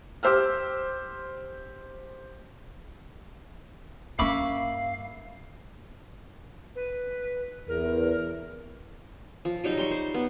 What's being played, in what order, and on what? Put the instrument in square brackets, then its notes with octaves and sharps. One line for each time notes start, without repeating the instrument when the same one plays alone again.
[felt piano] G4 C5 E6 F6
[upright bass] G2 C#4 [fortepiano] A#3 C#6 [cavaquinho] E5 B5 D6 [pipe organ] F5
[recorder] B4
[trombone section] E2 [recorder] A#4
[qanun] F3
F#3 G3 D#4
G3 C6 C#6
C5
B3